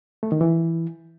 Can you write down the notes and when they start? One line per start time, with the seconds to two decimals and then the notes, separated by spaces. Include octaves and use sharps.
0.23 A3
0.32 D#3
0.41 E3